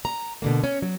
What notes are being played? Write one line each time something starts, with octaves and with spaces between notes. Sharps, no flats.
A#5
B2 D3 A#3
C#4
F#3